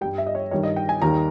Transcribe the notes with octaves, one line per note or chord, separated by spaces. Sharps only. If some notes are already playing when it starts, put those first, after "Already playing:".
G2 G3 G5
E5
D#5
C#5
G2 D#3 G3 C#5
D#5
G5
G#5
D#2 D#3 G3 A#5